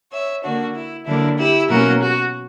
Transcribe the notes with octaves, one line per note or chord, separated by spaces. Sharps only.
C#5 E5
D3 A#3 D4 F#4
E4
D3 F#3 A#3 D4 E4
E4 G4
B2 F#3 A#3 C#4 F#4 A#4
F#4